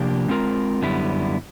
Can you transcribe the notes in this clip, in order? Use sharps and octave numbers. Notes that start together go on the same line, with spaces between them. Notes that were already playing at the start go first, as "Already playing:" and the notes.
Already playing: C3 F3 A#3 D4 G4
G#3 C4 F4 A#4
F#2 D3 G3 B3 E4